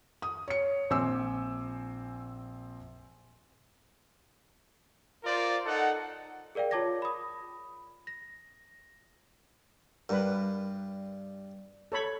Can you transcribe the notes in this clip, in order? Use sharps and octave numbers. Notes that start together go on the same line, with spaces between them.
D#6
C#5 C#7
A#1 C4 C5 G#5 D6 E6
F4 A#4 C5 D5
D#4 A4 F#5
G#4 A#4 D5 F5 G5
F4 C#5 A5 D6 G#6 A#6
B5 D#6
A#6
G2 A#4 B4
A4 C#5 B5